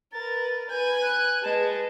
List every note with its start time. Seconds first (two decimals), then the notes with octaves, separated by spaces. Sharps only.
0.12 A#4 B4 A6
0.69 B4 G#5 G6
1.01 F#6
1.43 G#3 B4 A5